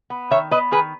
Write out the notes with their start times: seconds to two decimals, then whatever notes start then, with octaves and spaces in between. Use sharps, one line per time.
0.10 B3
0.31 D#3 C#5 E5
0.51 B3 B4 D#5
0.71 D#3 G#4 B4